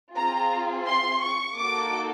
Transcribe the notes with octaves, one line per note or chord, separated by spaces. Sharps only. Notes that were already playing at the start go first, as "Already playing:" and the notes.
C4 F4 G#4 A#5
C6
C#6
A#3 D#4 F#4 A4 D6